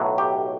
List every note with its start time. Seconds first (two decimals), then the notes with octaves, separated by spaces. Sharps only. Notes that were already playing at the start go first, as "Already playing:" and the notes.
Already playing: B1 A2 F#3
0.18 G4